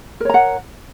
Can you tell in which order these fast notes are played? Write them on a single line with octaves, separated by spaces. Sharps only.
A#4 C#5 A#5 F#5